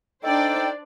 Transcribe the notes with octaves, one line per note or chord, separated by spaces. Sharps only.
D4 D#4 A4 C5 D5 G5